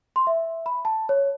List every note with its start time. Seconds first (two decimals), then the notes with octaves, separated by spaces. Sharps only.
0.16 C6
0.27 E5
0.66 B5
0.85 A5
1.09 C#5